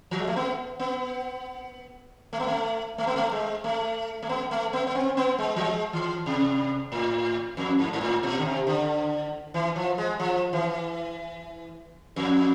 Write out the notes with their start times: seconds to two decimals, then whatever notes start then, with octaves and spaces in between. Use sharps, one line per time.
0.11 F3
0.19 G#3
0.28 A3
0.36 B3
0.79 B3
2.33 A3
2.40 B3
2.47 A3
2.98 A3
3.07 B3
3.16 A3
3.31 G#3
3.64 A3
4.22 A3
4.29 B3
4.51 A3
4.73 B3
4.87 B3
4.95 C4
5.17 B3
5.38 G#3
5.56 F3
5.60 G#3
5.93 E3
6.26 C3
6.92 A2
7.57 F2
7.79 G#2
7.93 G#2
8.01 A2
8.23 B2
8.39 D3
8.45 C3
8.67 D3
9.54 E3
9.76 F3
9.98 G#3
10.19 F3
10.53 E3
12.16 F2